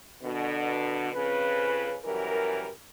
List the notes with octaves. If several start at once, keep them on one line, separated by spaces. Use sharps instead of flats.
B2 D3
F2 C#3 B4
F#2 E3 G3 A#4